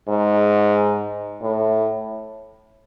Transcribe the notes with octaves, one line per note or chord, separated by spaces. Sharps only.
G#2
A2